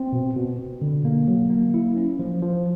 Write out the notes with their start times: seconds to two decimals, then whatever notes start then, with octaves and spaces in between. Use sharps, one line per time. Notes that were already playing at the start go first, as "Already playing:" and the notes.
Already playing: C4
0.12 B2
0.36 B2
0.59 B2
0.81 D3
1.05 A#3
1.28 F#3
1.50 A#3
1.74 E4
1.97 C#4
2.19 F3
2.42 F3